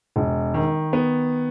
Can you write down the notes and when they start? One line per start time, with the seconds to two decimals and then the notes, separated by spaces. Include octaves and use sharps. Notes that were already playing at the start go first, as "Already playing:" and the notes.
0.16 E1
0.54 D#3
0.93 B3